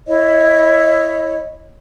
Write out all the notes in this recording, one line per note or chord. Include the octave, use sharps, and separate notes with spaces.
E4 C#5 D#5